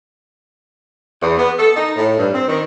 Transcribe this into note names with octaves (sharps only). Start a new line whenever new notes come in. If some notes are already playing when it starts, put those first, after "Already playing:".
E2
B3
A4
D#4
A2
G2
C4
D#3